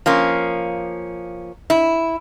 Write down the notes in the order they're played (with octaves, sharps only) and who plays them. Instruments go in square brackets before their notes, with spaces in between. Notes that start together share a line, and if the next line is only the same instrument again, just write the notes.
[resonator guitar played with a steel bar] F3 A#3 C#4
E4